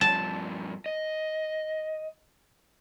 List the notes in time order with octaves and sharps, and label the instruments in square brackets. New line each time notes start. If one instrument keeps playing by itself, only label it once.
[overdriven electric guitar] G2 F3 [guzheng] A5
[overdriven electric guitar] D#5